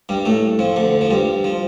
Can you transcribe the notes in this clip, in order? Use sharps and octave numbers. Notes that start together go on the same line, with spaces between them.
G2 G3
A2 A3
F2 F3
D2 D3
F3
G2 G3
F3